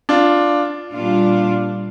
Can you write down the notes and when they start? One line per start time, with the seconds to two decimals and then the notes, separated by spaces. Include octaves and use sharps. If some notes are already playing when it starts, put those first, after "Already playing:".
0.09 D4 F4
0.93 A#2 G3 D4 F4